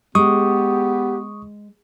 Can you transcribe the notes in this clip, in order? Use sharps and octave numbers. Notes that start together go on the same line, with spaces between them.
G#3 B3 G4 C#6 D#6